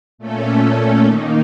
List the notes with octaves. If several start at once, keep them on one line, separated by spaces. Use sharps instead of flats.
A#2 A3 C#4 A4
D#3 A#3 D#4